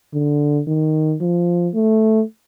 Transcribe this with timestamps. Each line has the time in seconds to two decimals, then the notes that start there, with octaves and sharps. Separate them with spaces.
0.13 D3
0.67 D#3
1.21 F3
1.74 A3